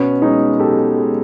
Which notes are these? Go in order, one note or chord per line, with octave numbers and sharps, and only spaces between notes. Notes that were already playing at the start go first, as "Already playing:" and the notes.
Already playing: B2 B3 C#4
G#3 C#4 D#4
B2 G4 A4
G#3